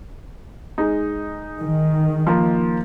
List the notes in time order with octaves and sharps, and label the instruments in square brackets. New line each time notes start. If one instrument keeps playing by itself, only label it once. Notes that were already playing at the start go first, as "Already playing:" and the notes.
[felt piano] G#3 D#4
[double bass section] D#3
[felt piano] F3 A#3